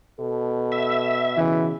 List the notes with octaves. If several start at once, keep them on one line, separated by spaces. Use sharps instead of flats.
B2 A4
E5
C#3 E3